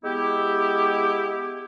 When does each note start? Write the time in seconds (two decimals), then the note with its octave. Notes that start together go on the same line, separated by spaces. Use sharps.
0.04 G#3 B3 E4 G4